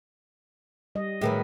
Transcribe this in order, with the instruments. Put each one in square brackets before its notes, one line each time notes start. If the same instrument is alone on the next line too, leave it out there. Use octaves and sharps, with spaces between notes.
[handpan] G3 D#5
[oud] A2 D#3 F#3 [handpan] G#4 A#4 B4